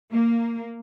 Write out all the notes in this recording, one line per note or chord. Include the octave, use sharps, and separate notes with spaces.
A#3